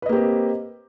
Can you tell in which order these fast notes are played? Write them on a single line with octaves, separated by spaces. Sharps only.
B4 D#5 A#3 G4 C4